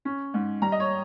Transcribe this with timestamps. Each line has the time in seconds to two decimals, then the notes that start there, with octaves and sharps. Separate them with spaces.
0.05 C#4
0.34 G#2
0.62 G3 A#5
0.72 D#5
0.80 C#5